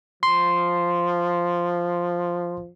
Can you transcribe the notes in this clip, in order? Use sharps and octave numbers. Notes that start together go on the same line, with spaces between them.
F3 C6